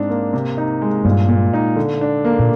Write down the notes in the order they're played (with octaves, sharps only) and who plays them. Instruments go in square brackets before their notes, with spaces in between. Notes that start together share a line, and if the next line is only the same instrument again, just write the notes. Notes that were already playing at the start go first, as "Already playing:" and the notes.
Already playing: [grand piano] G#2 C4 D4 D#4
A#3
C3
D#4
G#3
[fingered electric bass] G2 [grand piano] A#2
[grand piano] A#2
D#4
D3
D4
A#3
[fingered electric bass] A#2